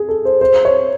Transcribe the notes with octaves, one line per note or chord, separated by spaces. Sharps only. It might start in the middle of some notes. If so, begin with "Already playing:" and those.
Already playing: G#4
A4
C5
C5
C#5